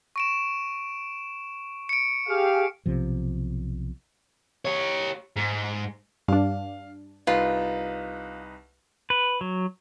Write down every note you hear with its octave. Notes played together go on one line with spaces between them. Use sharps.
C#6 D7 E7
C#7 D7
G4 G#4 F5
B1 C3 F3
G4 C#5
G#2
G2 D4 F5
C2 D#4 F4 B4
B4
F#3